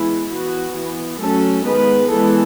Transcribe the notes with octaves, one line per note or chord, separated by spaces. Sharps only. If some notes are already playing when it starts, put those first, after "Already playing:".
Already playing: E3 G#3 B3 E4
E3 B3 F#4
E3 B3
F#3 A3 C#4 A4
D#3 G#3 B3 B4
E3 G#3 B3 A4